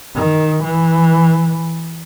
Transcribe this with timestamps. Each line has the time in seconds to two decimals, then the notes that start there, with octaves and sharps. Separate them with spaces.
0.16 D#3
0.64 E3